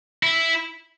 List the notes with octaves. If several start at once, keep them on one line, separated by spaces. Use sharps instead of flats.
E4